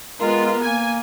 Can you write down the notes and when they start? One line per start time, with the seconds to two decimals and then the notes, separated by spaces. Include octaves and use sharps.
0.21 G#3 B3 F4 A#4
0.64 A#3 G#5